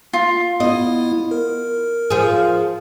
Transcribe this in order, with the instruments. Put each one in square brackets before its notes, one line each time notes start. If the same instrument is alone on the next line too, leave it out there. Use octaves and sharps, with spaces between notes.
[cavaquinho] F4
[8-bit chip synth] B3 E4 [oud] D#5
[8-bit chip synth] A#4
[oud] F3 G#4